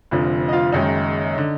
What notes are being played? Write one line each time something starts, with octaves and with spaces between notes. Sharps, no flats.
F1 F2 D3 F3
D#5
F4 F5
F#1 F#2 D#3 G#3 D#4 D#5
D3